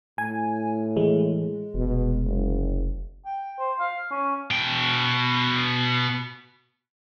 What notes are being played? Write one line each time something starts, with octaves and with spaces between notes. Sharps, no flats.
A2 G#5
E3 G#3
F1 B2
F#1
G5
C5
F5
C#4
B2 G5